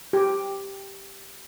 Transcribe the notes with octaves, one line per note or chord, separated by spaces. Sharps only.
G4